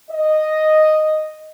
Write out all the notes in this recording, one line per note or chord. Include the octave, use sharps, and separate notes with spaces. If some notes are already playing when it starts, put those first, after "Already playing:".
D#5